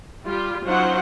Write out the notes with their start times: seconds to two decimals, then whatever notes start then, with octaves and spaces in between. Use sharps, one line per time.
0.24 G3 F4 G4
0.64 F#3 C#4 D#4 F4 C5 F#5